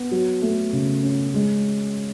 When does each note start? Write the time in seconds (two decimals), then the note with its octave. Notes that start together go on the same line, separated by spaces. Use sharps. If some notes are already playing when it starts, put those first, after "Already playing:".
Already playing: B3
0.11 F#3
0.42 A3
0.73 C#3
1.03 C#4
1.34 G#3